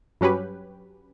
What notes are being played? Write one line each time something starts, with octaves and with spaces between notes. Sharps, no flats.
G2 F#3 C#4 G4 B4